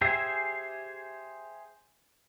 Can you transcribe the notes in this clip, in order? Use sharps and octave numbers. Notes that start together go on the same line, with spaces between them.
G4 G#4 C5 E5 G#5